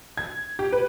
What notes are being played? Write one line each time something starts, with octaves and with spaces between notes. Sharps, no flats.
G#6
G4
B4